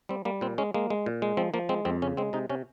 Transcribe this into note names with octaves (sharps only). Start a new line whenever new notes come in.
G3 C4
G3 A#3
A#2 C4
G#3 C#4
G#3 A#3
G#3
A#2
G#3
F3 C4
F3 A#3
G#3 C4
F2 C4
C#3 C#4
G#3 C4
C3 D#4
C3 C#4